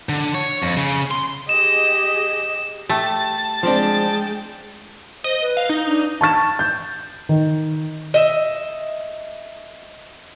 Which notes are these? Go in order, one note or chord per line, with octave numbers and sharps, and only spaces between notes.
D3
C#5
F2
C#3
C6
G4 G#4 D#5 E7
A3 G4 A5
F3 G#3 C4 D4 G5
C5 D#5
B4
F5
D#4
D4
A5 C#6 A6 E7
G6
D#3
D#5 E5